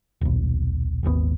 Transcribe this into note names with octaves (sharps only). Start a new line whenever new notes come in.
D#1 B1
D#1 G#1 D#2 B3